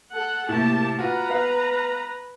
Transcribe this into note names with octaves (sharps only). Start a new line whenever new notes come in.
A4 F#5
A2 C3 A#3 G4 A5
F4 F#4 B4 A#5
B3 F5